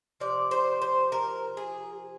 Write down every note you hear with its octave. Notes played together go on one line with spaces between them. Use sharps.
C3 F3 D5
C5
C5
A#4
G#4